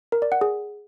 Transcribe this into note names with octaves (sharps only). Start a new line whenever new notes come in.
A#4
D5
F#5
G#4